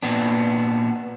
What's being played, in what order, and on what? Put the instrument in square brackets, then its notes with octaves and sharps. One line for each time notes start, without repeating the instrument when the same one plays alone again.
[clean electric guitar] A#2 B3 D4